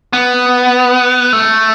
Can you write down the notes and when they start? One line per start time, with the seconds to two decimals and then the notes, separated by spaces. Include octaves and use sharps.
0.13 B3
1.33 A3